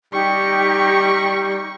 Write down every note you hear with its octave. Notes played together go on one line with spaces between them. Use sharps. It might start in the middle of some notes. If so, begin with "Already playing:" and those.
G3 D#4 G4 C#6